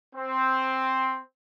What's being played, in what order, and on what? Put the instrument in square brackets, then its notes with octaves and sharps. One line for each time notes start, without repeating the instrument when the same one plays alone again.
[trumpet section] C4